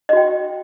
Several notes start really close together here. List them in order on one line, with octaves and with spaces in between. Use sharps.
D#5 F#4 G5